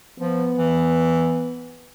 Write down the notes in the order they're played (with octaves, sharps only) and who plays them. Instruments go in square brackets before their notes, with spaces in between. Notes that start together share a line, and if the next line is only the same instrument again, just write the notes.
[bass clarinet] F3 [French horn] B3
[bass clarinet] E3